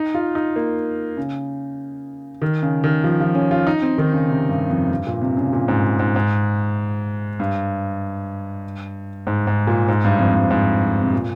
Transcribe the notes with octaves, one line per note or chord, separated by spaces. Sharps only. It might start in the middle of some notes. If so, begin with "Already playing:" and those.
Already playing: D#4
F4
D#4
A#3
C#3
D#3
C#3
D#3
F3
F3
C#4
F4
D#4
C4
D#3
C#3
C3
G2
F2
G2
A#2
C3
C#3
A#2
G#2
G#2
G#2
G2
G#2
G#2
A#2
G#2
G2
F2
G2
G#2
C3
A#2